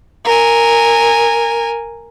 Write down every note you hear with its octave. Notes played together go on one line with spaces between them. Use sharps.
A#4 G#5